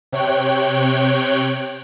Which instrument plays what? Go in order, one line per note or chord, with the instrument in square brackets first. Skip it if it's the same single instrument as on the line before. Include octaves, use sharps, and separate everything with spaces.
[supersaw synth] C3 C#5 G5 F#6